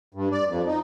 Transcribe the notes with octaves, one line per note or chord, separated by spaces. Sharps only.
G2
D5
F2
D#4